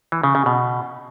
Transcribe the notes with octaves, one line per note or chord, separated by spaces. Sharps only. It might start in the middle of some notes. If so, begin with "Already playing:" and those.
E3
C#3
C#3
B2